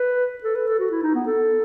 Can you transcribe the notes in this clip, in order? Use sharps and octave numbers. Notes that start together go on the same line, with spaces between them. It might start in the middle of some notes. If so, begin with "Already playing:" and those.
Already playing: B4
A4
B4
A4
F#4
E4
D#4
B3
A4